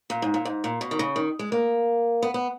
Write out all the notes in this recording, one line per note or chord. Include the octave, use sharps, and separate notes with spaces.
A#2
G#2
A#2
G#2
A#2
B2
D#3
C#3
D#3
G#3
A#3
B3
B3